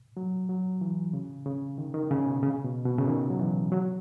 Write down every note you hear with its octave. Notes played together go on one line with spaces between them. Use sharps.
F#3
F#3
E3
C#3
C#3
D#3
D#3
C#3
B2
C#3
B2
B2
C#3
D#3
F#3
E3
F#3